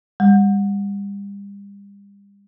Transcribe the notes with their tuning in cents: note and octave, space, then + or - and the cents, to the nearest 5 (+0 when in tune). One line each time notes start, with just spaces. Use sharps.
G3 +35